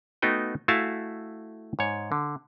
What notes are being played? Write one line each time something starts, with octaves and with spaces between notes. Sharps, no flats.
A3 B3 D#4 F#4 G5
A3 E4 F#4 F5 G#5 A5
G#2 C#5
D3